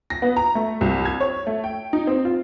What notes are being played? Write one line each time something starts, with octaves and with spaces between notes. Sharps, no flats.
A#6
B3
A#5
A3
C2
G#6
C#5
A3
G5
D#4
C4
F4